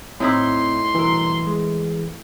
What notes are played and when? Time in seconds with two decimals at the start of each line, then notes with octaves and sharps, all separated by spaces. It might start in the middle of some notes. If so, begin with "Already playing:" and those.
0.20 A2 C4 D#4 E4 C6
0.95 B1 G2 E3 A#4
1.46 G#3